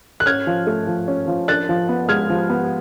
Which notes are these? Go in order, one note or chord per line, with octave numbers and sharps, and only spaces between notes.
F#6
C#4 F6 G#6
F3
A3
F3
C#4
F3
D4 F#6 A6
F3
B3
G#3 F6 G#6
F3
B3